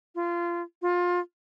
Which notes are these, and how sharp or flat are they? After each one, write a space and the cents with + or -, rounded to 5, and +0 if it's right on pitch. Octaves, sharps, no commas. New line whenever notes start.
F4 -20
F4 +25